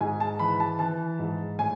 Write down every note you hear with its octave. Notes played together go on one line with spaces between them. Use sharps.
G#2 G#5
A5
E3 B5
A5
E3 A5
G#2
A2 G#5